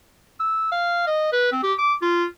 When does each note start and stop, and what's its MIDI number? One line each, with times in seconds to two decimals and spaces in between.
0.40 0.69 88
0.72 1.04 77
1.07 1.28 75
1.32 1.51 71
1.52 1.61 60
1.63 1.73 67
1.78 1.93 86
2.02 2.25 65